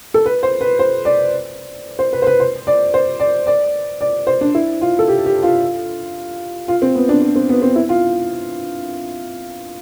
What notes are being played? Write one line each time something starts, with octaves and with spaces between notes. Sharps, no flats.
A4
B4
C5
B4
C5
D5
C5
B4
C5
B4
C5
D5
C5
D5
D5
D5
C5
D4
E4
F4
A4
G4
G4
F4
F4
C4
B3
D4
D4
C4
B3
C4
E4
F4